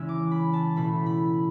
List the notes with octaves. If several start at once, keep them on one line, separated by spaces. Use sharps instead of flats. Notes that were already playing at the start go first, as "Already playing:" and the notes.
Already playing: C#3 E3 G#3 C#4 E4 E6
D6
B5
A5
B2 A3 E4 B5
B5